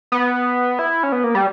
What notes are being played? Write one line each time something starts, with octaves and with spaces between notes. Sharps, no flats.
B3
E4
C#4
B3
A#3
G3